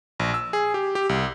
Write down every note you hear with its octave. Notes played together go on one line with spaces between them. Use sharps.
A#1
E6
G#4
G4
G4
C2